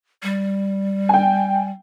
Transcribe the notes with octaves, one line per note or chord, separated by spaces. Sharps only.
G3
G5 G#5